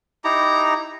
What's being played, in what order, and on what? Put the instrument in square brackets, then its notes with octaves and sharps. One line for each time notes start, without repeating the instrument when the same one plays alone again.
[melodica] D#4 E4 G4 A#5